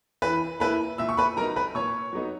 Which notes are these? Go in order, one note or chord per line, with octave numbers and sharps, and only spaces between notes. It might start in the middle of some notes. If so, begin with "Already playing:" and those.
E3 B4 B5
A#3 E4 B4 B5
A#2 E5 E6
C#6
B4 B5
F#3 B3 D#4 A#4 A#5
B4 B5
A#2 C#5 C#6
F#3 B3 D#4